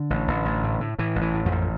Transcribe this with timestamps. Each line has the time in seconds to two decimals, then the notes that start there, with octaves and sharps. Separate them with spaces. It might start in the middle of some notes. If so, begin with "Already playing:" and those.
Already playing: D3
0.10 A1
0.28 A1
0.45 A1
0.64 A2
0.81 A2
0.99 A2 E3
1.16 A1
1.22 E3
1.34 A2
1.46 F2 F3
1.52 A1